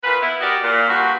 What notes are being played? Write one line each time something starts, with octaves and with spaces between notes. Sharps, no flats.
A#2 B4
B3 E4
F#4 G4 A#4 D5 D#5
A#2
G2 A#2 F#4